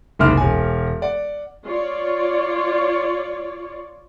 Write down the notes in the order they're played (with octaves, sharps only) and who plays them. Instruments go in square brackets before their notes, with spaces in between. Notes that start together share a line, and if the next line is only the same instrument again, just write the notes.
[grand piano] F#1 C2 G#2 F5 D6 F6
E1 G#5
D5 F#5
[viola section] F4 C#5 D5